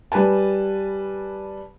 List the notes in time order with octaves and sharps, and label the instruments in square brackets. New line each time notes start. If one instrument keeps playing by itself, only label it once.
[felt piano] G3 B4 G#5 A5